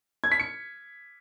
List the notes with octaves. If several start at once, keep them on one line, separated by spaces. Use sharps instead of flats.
G#6
B6
C#7